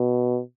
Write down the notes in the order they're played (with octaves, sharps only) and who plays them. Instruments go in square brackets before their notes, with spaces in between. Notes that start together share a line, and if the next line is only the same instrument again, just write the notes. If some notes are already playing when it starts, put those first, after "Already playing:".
Already playing: [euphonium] B2